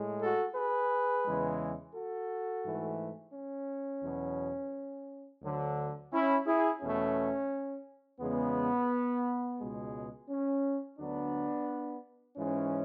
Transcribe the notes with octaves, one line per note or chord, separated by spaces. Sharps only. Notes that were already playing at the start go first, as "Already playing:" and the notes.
Already playing: A2 G#3
F#4 A4
G#4 B4
E2 C#3 E3 G#3
F#4 A4
G#2 E3 A3
C#4
E2 B2 F#3
D2 D3 F#3
C#4 E4
E4 G#4
E2 B2 A3 C#4
E2 C#3 G#3 B3
C#2 B2 G#3
C#4
D2 D3 F#3 B3 D4
G#2 E3 G#3 C#4